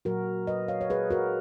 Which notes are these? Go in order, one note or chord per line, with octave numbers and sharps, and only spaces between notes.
A#2 F#3 A#3 F#4 A#4
B4 D#5
C#5 F5
C#5
G#4 B4
F#4 A#4